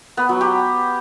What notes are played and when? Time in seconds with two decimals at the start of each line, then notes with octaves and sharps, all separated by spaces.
0.17 B3
0.29 F#3
0.41 G4